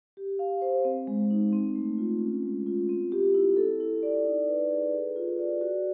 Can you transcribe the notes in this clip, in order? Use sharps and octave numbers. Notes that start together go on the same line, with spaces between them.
G4
F5
C5
C4
G#3
D#4
C4
A3
F4
C#4
G#3
F4
C4
G4
E4
A4
E4
D5
D#4
B4
G#4
A4
F4
D5
F#4